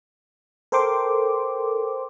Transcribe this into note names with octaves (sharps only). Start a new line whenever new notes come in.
A4 A#4 C5 G5 C6 D6